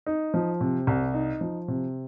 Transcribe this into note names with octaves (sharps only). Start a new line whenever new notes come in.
D#4
F3
C3
C2
D#4
F3
C3